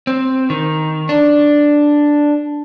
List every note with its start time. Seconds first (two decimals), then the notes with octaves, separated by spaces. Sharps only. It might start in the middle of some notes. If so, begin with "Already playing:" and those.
0.07 C4
0.50 D#3
1.09 D4